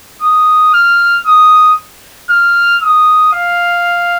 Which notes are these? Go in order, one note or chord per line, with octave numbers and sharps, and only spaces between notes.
D#6
F6
D#6
F6
D#6
F5